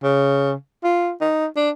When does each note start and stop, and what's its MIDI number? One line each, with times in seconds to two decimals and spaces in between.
0.03 0.53 49
0.84 1.11 65
1.21 1.46 63
1.56 1.70 62